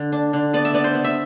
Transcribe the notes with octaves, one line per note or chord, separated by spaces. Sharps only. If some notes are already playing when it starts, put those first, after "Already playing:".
Already playing: D3
D4
D3
B3 D5
E5
B3 D5
C5
B3
E5